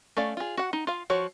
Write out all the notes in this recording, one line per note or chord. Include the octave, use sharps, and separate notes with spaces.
A3 C#4 D5 F5
F4 G#4
F#4 F#5
D#4
F4 F5
F3 F#4 C#5